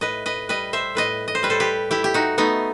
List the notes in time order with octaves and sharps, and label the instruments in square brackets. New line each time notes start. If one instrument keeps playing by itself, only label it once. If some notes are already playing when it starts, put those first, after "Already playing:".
[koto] A2 B4 D#5
B4 D#5
G3 B4 D#5
C5 E5
A2 B4 D#5
D#5
C5
G3 B4
A4 C5
G4 B4
A3 E4 G4
G4
D#4 F#4
A3 B3 D#4